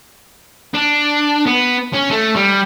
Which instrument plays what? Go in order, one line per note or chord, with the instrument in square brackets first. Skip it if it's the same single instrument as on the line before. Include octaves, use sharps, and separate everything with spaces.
[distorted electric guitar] D4
B3
C#4
A3
G3